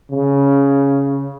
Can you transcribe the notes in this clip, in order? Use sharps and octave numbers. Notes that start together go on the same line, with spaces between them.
C#3